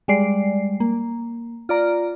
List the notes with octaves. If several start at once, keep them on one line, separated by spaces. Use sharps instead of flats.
G3 G#3 D5 C7
A#3
F4 D5 A#5